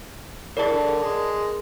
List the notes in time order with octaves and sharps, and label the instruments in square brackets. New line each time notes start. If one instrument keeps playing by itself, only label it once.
[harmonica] E3 [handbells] G#4 A#4 [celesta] C#5 D5 A5
[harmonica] D3
G#3